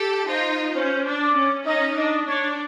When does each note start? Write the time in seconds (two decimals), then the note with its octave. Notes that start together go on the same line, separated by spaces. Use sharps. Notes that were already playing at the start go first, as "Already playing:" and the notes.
Already playing: G4 A4
0.28 D#4 F4 C5
0.75 C#4 C5
1.05 D4
1.21 D5
1.36 C#4
1.66 C#4 D#4 D#5
1.96 D4 D#5
2.27 D4 C#5